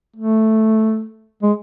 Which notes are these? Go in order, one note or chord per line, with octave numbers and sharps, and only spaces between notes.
A3
G#3